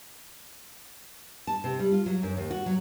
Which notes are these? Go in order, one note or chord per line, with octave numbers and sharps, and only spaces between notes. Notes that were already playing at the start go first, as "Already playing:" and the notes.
A5
C3
G3
F4
F#3
F#2
D#2
F#4
F#3